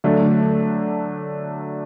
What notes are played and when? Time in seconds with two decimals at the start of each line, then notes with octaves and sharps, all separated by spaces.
0.04 D3 F#3 A3 D4